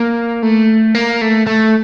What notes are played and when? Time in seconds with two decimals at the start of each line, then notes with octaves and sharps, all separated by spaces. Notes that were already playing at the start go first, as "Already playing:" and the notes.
Already playing: A#3
0.43 A3
0.95 A#3
1.21 A3
1.47 A3